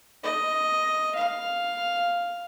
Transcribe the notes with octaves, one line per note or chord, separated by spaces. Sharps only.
D#5
F5